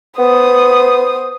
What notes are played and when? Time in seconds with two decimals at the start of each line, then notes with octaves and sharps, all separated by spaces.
0.19 B3 C5 D#6